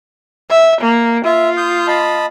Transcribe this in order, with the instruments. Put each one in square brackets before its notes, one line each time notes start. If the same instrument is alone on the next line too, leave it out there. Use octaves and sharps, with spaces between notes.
[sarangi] E5
A#3
[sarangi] F4 [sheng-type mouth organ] E5
[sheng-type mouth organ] D#6 G6
D#5 A5 B5